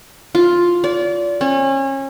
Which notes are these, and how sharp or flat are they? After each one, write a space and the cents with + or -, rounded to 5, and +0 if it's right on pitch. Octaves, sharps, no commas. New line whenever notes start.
F4 +5
D5 -30
C#4 -30